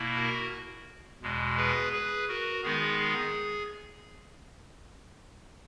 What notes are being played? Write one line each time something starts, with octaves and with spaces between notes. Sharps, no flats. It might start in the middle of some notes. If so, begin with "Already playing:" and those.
Already playing: B2 A#3 E4
F#4 A#4
E2 B2 G#3
G#4 B4
G#4 B4
F#4 A#4
D#3 G#3 B3 D#4 G#4
G#4